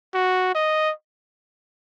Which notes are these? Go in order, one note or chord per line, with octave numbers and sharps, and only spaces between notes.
F#4
D#5